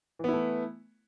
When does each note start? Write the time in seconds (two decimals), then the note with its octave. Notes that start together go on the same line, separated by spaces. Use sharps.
0.19 E3
0.24 B3
0.29 E4
0.33 A3